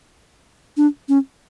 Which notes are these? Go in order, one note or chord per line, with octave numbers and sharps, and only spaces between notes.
D4
C#4